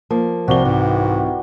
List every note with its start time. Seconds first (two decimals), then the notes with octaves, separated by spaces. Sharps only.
0.11 F3 A#3
0.48 C2 F3 G3 F#4 G7
0.65 G#2 E3